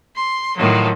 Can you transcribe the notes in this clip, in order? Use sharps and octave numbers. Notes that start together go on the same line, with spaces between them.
C6
A2 D#3 F3 F#3